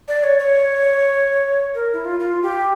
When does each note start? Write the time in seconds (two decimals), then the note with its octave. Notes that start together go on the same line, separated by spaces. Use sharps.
0.08 D5
0.24 C#5
0.39 C#5
1.75 A#4
1.93 E4
2.05 F4
2.20 F4
2.43 G4